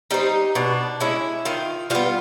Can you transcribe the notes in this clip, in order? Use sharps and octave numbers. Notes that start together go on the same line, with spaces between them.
G3 C4 D#4
B2 D4
G#3 C#4 E4
D#3 F4
G3 B3 F4